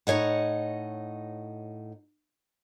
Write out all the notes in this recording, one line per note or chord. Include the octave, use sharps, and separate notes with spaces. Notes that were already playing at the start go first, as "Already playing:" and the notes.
A2 D#4 C#5 D#5 F#5